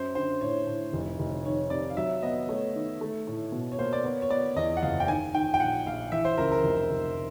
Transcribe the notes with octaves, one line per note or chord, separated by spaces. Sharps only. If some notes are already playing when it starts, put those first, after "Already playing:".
Already playing: F#2 C5
D3 C5
A2 C#5
A2
F1
F1
D#3 C#5
C3 D5
F5
F#3 E5
B3 D#5
A3 C#5
D#3
A3
A2
B2
C#5
A#3 C5
D5
B3 C#5
C#5
B3 D5
E2 D#5
F#5
F#1 F5
G5
D#3 G#5
D#3 G5
G5
A#1 F#5
A#1 F5
E3 E5
C5
C#2 A#4
A#4
F1
F1